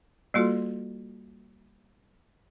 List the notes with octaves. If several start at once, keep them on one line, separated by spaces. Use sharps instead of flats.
G3 A#3 F4 F#4 A4